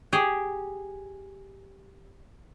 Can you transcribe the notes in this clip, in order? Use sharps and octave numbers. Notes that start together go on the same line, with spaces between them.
G4 G#4